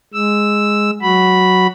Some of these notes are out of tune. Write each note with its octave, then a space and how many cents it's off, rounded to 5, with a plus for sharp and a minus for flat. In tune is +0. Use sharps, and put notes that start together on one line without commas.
G#3 +0 E6 +0
F#3 +0 F#4 +0 B5 -5